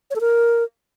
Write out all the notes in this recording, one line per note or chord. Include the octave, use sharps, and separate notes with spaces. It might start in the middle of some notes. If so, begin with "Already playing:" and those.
C#5
A4
A#4